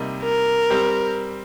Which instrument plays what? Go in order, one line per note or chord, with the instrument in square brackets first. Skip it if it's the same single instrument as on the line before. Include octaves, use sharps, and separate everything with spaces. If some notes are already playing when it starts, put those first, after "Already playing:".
Already playing: [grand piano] C3 G3 A#3 D#4
[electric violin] A#4
[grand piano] G3 C4 G4